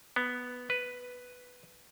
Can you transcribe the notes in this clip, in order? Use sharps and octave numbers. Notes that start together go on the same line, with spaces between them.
B3
B4